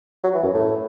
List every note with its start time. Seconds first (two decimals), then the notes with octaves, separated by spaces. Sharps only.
0.24 F#3
0.34 E3
0.43 F#2
0.54 A2